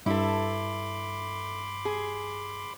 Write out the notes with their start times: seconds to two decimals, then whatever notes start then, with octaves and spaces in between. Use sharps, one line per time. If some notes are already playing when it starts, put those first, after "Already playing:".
0.06 G2 E4 A4 B5 C6 D6
1.85 G#4